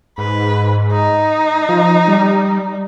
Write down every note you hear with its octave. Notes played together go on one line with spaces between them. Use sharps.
G#2 B4
D#4
F3
G3